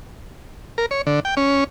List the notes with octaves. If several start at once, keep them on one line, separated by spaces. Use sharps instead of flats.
A#4
C#5
D3
G5
C#4